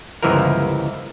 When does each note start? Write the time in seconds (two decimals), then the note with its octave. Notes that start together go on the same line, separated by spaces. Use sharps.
0.23 G1 C#2 E3 F3 E4 A#4